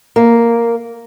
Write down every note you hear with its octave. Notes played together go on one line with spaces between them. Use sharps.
A#3